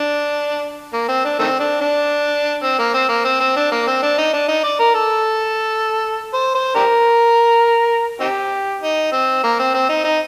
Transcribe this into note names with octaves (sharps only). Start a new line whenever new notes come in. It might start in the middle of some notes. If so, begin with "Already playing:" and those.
Already playing: D4
A#3
C4
D4
D#3 A3 C4
D4
D4
C4
A#3
C4
A#3
C4
C4
D4
A#3
C4
D4
D#4
D4
D#4
D5
A#4
A4
C5
C5
D4 G4 A#4
C4 D#4 G4
D#4
C4
A#3
C4
C4
D#4
D#4